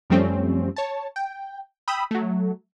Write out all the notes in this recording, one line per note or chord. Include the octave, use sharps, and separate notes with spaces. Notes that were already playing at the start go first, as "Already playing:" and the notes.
F#2 F3 G3 A3 C4 C#4
C#5 A5
G5
G5 B5 D#6 E6
F#3 A3